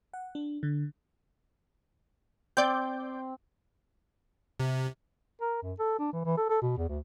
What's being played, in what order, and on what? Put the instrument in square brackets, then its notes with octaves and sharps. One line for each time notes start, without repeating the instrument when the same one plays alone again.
[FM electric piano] F#5
D4
D3
[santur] C4 [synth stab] D5 D6 G6
[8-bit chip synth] C3
[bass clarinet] A#4
F#2
A4
D4
E3
E3
A4
A4
B2
E2
D2